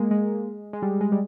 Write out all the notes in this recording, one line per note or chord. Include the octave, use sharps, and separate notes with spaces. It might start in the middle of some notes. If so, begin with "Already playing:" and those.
Already playing: G#3 A#3
G#3
G#3
G3
G#3
G3